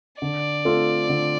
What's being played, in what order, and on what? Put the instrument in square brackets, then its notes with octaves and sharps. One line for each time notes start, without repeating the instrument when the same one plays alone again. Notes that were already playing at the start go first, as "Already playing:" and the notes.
[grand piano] D3 [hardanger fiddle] D5
[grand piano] A3 C4 F4 A4
D3